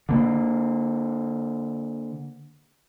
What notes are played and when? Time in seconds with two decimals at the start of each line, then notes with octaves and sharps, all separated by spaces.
0.09 D3 A#3